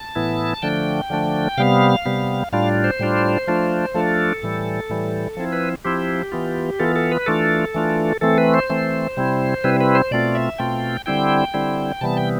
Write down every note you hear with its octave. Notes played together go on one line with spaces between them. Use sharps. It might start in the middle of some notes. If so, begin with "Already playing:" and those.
Already playing: A5
A2 E3 B3 E4
D3 F3 A3 D4 G5
D3 F3 A3 D4
C3 G3 B3 F5
C3 G3 B3
A2 G3 D4 F4 F5
C5
A2 G3 D4 F4
F3 A3 D4 F4
F3 A3 D4 F4 A4
A2 E3 G3
A2 E3 G3
F3 C4 E4
B4
F3 C4 E4 G4
E3 B3 F4
E3 B3 F4 A4
A4
B4
E3 A3 D4 F4 A4
E3 A3 D4 F4
E3 A3 C4 A4
B4
C5
E3 A3 C4
C3 G3 C4 E4
C3 G3 C4 E4 B4
B4
C5
B2 A3 C4 F4 D5
E5
B2 A3 C4 F4 G5
D3 G3 C4 E4 G5
D3 G3 C4 E4
C3 E3 G3 B3 A5
G5